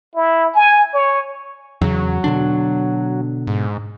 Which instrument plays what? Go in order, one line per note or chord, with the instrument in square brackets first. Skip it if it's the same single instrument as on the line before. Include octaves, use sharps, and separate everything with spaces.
[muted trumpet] E4
G#5
C#5
[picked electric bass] E2 C#3 [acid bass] F#3
[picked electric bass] B2 D3 D4
[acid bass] G#2